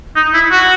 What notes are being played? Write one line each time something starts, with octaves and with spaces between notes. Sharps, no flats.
D#4
E4
F#4